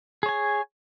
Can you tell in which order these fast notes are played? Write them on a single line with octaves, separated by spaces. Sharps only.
G#4 C#5 G#5